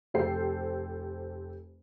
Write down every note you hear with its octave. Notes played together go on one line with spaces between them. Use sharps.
F1 G4 A4 C5 C7